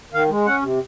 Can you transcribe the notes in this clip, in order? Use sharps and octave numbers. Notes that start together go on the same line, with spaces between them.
D#3 F5
G#3
C#4 F#5
C3